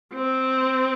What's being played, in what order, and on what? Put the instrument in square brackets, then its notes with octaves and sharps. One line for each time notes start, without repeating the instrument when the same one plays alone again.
[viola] C4